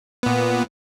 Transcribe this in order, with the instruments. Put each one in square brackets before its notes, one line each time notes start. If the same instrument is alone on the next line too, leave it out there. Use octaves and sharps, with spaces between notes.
[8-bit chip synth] A#2 B3